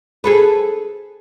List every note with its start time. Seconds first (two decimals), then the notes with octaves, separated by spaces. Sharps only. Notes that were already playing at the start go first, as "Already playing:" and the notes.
0.24 G#4 A4 B4